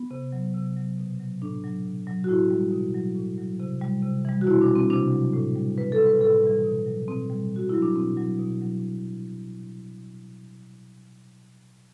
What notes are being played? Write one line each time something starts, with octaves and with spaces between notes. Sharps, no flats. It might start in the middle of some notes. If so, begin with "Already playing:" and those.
Already playing: B3
C3
F#3
C3
F#3
B2
F#3
A2 D4
F#3
B2
F#3
F#4
A2 E4
E3 G3
B2
F#3
A2
F#3
C3
G3
C3
E3 G3
F#4
B2 E4
D4
G3
C4
C3 D4
F#3
A2
G3
A2 B4
A4
G3
B4
A2 A4
E3 G3
B2
F#3
B2 C4
G3
B2 F#4
F#3 E4
D4
B2 C4
F#3
B2
F#3